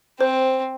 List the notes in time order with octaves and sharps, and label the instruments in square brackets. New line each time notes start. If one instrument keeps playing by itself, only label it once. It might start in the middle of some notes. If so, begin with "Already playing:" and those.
[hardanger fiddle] C4 [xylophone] C5